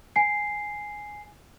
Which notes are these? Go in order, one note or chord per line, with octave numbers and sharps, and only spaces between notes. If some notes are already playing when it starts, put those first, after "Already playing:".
G#5 C7